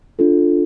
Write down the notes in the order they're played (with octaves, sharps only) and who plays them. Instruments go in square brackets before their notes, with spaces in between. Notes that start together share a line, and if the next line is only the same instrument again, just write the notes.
[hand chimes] D4 F4 A4